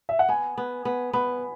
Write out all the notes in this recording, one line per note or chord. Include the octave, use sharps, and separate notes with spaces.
E5
F#5
B3 G#5
B3
B3
B3 B5